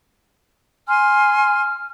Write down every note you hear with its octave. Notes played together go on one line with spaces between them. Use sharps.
G#5 C6 F6